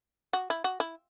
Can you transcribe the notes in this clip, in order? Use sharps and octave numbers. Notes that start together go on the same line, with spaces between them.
F#4
E4
F#4
E4